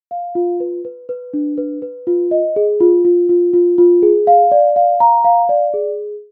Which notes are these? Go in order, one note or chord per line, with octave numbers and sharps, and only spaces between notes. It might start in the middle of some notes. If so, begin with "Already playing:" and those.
F5
F4
B4
B4
B4
D4
B4
B4
F4
D#5
G#4
F4
F4
F4
F4
F4
G#4
F5
D5
F5
A#5
F5
D5
G#4